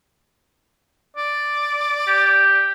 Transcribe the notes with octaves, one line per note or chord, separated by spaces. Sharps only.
D5
G4